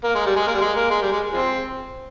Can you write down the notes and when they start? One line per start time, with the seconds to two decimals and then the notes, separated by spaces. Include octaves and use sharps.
0.04 A#3
0.15 G#3
0.26 G3
0.36 G#3
0.47 A#3
0.54 G3
0.61 G#3
0.77 A#3
0.90 G#3
1.02 G3
1.12 G#3
1.33 F3 G#3 C4